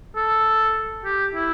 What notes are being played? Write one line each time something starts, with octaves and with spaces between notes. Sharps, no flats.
A4
G4
E4